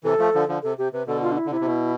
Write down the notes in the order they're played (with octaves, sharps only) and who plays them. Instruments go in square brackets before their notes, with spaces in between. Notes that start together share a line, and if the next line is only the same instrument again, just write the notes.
[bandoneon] C3 E3 [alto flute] A4
[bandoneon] F3 A3
D3 F3
D3 F3
[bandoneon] C3 [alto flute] A4
[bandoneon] C3 [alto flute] G4
[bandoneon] C3 [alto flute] B4
[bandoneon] B2 D3 [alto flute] A4
[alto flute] F4
D4
E4
[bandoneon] D3
[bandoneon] C3 [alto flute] E4
[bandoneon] C3
B2